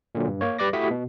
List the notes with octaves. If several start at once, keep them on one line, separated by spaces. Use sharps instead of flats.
A#2 D3 F#3
G2
A#3 C#5
G3 B4 D5 D6 A#6
A3 E4 F#4 G4 D#6 B6
B2